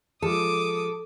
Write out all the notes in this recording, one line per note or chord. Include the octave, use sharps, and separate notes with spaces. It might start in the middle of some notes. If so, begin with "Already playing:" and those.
F3 G#3 A4 D6 D#6